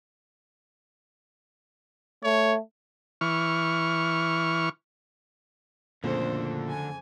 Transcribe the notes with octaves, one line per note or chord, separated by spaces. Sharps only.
A3 C#5
E3 C#6 F6
F#1 F2 A#2 D3 A3 C5
G#5